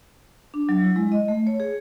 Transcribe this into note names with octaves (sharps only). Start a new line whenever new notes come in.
D4
F#3
E4
G#3
D#5
A3
C#5
G#4